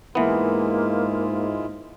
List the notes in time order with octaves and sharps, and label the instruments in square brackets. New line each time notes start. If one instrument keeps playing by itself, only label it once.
[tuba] G#2 [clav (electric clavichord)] E3 B3 [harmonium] G#3 E4 F4 [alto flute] A#3